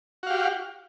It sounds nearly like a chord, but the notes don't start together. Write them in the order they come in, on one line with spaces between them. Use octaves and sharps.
F#4 F5 G4